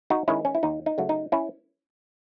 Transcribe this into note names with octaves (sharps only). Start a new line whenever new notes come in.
D#4 F#4
D#3 G#3 C#4 E4
C#4
E4
D#2 D#4
D#4
C#3 F#3 A3
D#4
C#4 E4